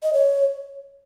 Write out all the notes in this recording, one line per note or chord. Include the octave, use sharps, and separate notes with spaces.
D#5
C#5